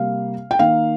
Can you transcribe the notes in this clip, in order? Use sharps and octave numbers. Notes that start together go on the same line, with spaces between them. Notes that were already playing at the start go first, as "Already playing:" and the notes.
Already playing: C3 G3 A#3 F5
G5
D#3 A#3 F5